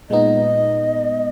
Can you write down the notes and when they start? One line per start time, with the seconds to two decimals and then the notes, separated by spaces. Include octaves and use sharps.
0.10 A#2 G#3 B3 D#4 D#5